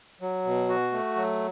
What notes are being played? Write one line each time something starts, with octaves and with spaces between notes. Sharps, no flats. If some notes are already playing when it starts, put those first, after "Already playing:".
F#3
B2
F#4
A3
F#3